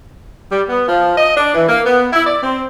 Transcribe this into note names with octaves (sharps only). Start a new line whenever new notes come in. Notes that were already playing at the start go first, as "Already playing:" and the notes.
G3
B3
F3
D#5
D4
E3
A#3
B3
E4
D5
C4